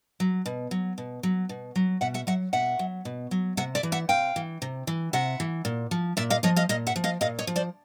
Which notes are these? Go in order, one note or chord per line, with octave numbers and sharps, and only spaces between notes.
F#3
B2
F#3
B2
F#3
B2
F#3
B2 E5 F#5
E5 F#5
F#3 E5 F#5
B2 E5 F#5
F#3
B2
F#3
C3 E5 F#5
D5 E5
E3
E5 F#5
C3 F5 G5
E3
C3
E3
C3 E5 F#5
E3
A#2
F3
A#2 D5 E5
D#5 F5
F3 C#5 D#5
D#5 F5
A#2 D#5 F5
E5 F#5
F3
D#5 F5
A#2 D#5 F5
C#5 D#5
F3
C5 D5